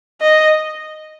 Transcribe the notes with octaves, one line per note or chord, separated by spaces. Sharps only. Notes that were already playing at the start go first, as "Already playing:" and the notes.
D#5